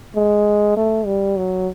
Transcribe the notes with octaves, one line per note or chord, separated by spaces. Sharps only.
G#3
A3
G3
F#3